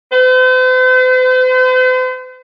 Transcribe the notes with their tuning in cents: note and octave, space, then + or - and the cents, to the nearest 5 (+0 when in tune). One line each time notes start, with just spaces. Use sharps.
C5 -45